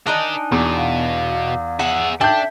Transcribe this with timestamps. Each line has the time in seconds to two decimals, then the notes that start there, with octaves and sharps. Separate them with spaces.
0.07 D4 D#4 A#4 D#5 G#5
0.52 E2 B2
0.77 F5
1.79 G#4 E5 F#5
2.21 D4 A4 E5 G5 A5 G6